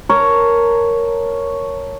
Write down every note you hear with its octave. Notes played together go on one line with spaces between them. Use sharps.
A#4 C#5 A5 A#5